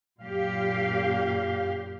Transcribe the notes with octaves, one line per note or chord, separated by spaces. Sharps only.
F#2 A#2 G4 F5